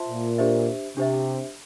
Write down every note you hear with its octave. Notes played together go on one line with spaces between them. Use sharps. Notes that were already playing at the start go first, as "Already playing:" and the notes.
Already playing: F4 C5 E5 A5 C6
A#2
D4 G4 C5 E5
C3 D4 G4 C5 E5